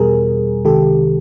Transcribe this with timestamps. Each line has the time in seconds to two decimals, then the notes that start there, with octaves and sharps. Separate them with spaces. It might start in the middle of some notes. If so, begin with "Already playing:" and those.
Already playing: E2 B2 G3 G#4 A#4
0.65 C2 C3 D#3 G#3 G4 A4